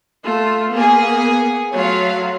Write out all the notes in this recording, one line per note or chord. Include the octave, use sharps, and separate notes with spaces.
A3 F4
A#3 B3 G#4
F#3 A3 F4 C#5 F5